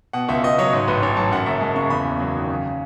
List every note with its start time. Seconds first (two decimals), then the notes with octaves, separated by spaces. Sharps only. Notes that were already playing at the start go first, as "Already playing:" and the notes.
0.13 B2 F#5
0.28 C#2 E5
0.44 C#2 D#5
0.58 F#3 C#5
0.73 G#2 C#5
0.88 A1 B4
1.02 A1 C#5
1.17 F#3 A5
1.31 F#2 F#5
1.46 F#1 E5
1.61 G#3 A5
1.76 C#3 C#6
1.90 E2 B5
2.05 F#1
2.20 F#3
2.35 D#3
2.50 C#3